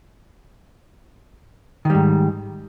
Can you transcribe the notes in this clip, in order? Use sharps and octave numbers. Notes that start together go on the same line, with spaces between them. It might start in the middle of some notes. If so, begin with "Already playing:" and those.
G#2 D#3 G3